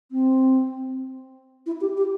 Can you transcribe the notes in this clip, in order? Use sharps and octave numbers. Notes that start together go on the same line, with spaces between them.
C4
E4
G4
G4